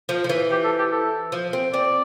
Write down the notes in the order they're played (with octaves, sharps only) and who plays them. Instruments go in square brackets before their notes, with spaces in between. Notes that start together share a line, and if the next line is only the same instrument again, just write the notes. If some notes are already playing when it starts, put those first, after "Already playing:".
[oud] F3
F3
E3
[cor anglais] G4
A4
G4
A4
[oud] F3
C4
[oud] C4 [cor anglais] D5